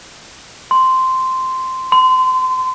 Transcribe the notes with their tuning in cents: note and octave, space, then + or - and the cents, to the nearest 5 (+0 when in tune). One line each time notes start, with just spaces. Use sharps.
C6 -10
C6 -30